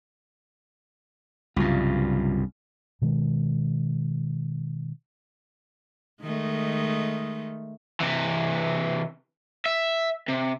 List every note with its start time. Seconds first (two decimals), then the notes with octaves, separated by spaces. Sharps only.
1.56 C2 G2 C#3 F#3 F4
3.02 B2 D#3 G#3
6.23 D#3 G#3 A3
8.00 C3 E3
9.66 E5
10.29 C3